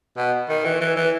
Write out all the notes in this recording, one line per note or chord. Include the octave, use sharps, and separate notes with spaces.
B2
D#3
E3
E3
E3